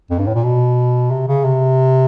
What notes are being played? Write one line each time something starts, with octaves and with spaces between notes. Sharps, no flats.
F2
G2
A2
A#2
B2
C3
C#3
C3